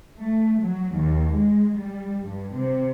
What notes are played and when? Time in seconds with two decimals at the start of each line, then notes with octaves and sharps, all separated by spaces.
0.17 A3
0.60 F#3
0.93 D#2
1.32 G#3
1.76 G3
2.24 G2
2.57 C3